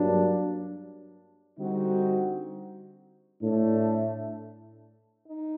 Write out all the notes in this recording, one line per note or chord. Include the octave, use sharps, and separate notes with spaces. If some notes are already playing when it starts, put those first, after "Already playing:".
Already playing: G2 F#3 A#3 D4
D3 G3 C4 D#4 F#4
A2 A3 D4
D#4